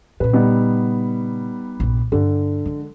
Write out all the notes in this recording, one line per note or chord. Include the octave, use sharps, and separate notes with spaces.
A#2 C#3 B4
G3 B3 D#4
A#1 G2
G2 D3 E4
F3 G#3